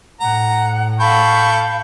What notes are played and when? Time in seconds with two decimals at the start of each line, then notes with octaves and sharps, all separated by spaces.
0.21 A2 F#5 A#5
1.00 A4 F5 G5 B5 C#6